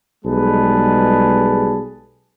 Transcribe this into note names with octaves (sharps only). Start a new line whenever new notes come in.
B1 G3 G#3 G#4 B4 A5